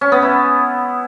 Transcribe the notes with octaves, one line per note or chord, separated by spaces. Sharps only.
C#4
B3
E4